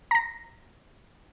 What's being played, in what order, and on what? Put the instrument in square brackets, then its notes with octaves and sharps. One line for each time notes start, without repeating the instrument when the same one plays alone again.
[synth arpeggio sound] A#5 A#6